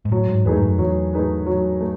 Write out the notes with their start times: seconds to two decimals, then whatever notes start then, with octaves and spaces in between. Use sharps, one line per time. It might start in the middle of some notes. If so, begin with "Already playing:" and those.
0.05 G#2
0.12 A2 F#3
0.29 G#2
0.45 E2 A3 D#4 G#4 B4
0.57 G#2
0.62 F#2
0.79 E2 F#3
1.14 A3 D#4 G#4 B4
1.46 F#3
1.81 A3